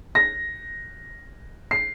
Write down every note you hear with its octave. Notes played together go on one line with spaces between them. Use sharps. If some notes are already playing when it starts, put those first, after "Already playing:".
A#6
C7